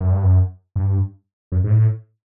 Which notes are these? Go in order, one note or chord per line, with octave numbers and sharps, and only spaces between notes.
F#2
G2
F#2
G2
F#2
G#2
A2